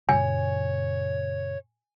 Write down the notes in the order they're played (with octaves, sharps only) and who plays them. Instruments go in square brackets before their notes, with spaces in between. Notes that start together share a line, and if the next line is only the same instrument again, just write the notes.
[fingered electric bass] F#2 A#2 C#3 [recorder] C#5 [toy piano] G#5